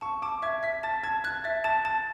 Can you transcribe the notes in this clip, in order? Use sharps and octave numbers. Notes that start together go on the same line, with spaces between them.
A5 C#6
A5 D6
E5 G#6
E5 B6
A5 A6
A5 G#6
F#6 G#6
E5 A6
A5 A6
A5 A6